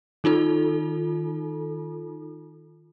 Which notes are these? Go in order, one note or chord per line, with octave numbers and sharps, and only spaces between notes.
D#3 D#4 F4 A4